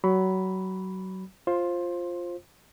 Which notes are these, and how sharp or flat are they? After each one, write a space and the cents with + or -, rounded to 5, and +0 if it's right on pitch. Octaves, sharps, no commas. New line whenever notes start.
F#3 +25 B5 +0
F4 +0 C5 +15